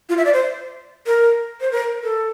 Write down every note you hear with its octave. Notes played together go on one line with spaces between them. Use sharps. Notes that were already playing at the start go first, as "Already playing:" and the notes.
F4
E5
D5
C5
A#4
C5
A#4
A4